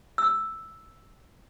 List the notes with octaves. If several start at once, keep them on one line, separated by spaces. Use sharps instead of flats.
E6